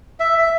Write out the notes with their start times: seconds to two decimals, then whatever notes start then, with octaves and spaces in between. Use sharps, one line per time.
0.20 E5
0.38 E5